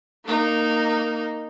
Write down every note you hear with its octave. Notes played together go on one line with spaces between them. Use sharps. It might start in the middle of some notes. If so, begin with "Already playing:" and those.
A#3 D#4